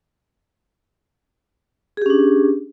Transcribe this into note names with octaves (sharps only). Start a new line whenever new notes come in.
C#4 D4 G4 G#4